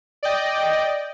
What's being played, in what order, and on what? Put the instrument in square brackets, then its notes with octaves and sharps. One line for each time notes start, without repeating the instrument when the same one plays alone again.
[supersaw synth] D5 D#5 G5